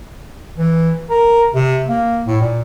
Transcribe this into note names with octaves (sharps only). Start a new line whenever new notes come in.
E3
A#4
C3
A#3
A2
A#2